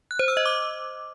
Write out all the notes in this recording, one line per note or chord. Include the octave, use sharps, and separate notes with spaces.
F#6
C5
E6
D#5
D6